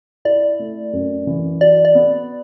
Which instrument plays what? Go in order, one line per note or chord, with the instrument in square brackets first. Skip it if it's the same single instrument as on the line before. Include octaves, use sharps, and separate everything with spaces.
[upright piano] E4 [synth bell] D5
[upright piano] A3
F#2
E3
[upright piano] F#4 [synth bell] D5
[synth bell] D5
[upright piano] B3